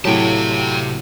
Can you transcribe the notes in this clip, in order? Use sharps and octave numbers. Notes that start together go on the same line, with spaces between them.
A2 C3 F#3 G4 G5 A5